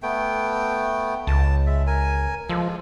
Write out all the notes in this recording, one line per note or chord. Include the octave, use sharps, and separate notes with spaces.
A3 B3 G5
C#2 A5
G#3 E5
A#4 G#5
F3 G#3 F4 A4